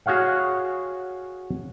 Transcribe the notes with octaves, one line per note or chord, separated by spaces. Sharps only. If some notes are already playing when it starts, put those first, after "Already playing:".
F#4 G#4 C#5 F5 F#5